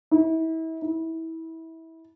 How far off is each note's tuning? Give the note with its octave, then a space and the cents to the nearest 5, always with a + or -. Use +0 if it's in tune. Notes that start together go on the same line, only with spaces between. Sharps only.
E4 -35
E4 -25